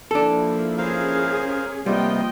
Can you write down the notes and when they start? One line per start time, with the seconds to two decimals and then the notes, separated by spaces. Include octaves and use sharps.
0.11 F3 A#3 D4 E4 A4
0.78 C#4 G#4 A#4 C5 F5
1.86 C3 F3 G3 A#3 B3 F4 D#5 G5